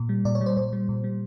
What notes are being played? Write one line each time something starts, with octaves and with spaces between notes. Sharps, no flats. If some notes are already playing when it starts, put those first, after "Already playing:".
Already playing: A#2
G3
A#2 D5
C#5
G3
C5
A#2 C5
G3
A#2
G3